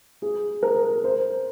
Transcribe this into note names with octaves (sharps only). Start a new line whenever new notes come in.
G#4
A#4
C5